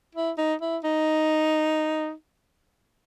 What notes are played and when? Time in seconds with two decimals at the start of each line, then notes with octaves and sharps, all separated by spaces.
0.15 E4
0.38 D#4
0.61 E4
0.84 D#4